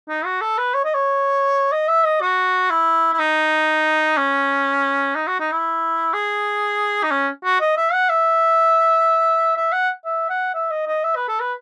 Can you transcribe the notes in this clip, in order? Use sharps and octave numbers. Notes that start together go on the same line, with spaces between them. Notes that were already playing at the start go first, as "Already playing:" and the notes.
D#4
F#4
A4
B4
C#5
D#5
C#5
D#5
E5
D#5
F#4
E4
E4
D#4
C#4
D#4
F#4
D#4
E4
G#4
D#4
C#4
F#4
D#5
E5
F#5
E5
E5
F#5
E5
F#5
E5
D#5
D#5
E5
B4
A4
B4